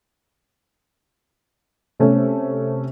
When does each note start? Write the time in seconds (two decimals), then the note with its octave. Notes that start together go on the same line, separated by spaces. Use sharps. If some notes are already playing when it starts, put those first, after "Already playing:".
2.00 C3 A3 C#4